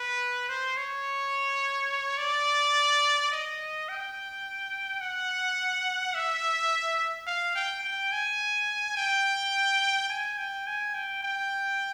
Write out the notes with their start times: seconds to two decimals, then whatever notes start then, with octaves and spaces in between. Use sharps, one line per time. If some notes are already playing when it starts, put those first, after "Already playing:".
Already playing: B4
0.49 C5
0.77 C#5
2.18 D5
3.32 D#5
3.88 G5
5.01 F#5
6.14 E5
7.27 F5
7.55 G5
7.84 G5
8.12 G#5
8.97 G5
10.10 G#5
10.38 G5
10.67 G#5
10.95 G5
11.23 G5